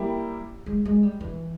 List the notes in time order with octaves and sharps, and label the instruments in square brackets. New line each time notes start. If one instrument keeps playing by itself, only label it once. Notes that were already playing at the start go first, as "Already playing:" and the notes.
Already playing: [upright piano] G3 A#3 E4 G4
[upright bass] G#3
G#3
G3
E3